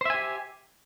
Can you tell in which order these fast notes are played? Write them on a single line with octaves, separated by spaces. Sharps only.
C5 E5 G#5 G4